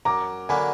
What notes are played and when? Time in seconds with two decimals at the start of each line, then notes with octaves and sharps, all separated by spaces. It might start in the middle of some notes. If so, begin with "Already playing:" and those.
0.05 F#2 A#5 D6
0.49 D3 F#3 A#3 D4 G#5 B5